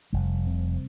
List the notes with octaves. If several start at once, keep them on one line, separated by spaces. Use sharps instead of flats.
F1 G3
C3